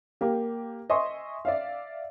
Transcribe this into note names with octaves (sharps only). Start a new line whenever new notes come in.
A#3 G4
D#5 E5 G#5 C6 C#6
D5 E5 F5